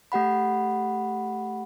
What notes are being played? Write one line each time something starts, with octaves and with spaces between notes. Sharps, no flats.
A3 G4 F#5 B5